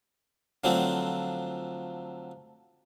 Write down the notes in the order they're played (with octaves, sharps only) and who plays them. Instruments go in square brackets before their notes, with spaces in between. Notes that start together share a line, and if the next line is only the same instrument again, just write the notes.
[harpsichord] D3 F3 F#3 A3 C4